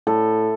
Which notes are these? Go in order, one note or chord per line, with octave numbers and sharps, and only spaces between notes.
A2 A4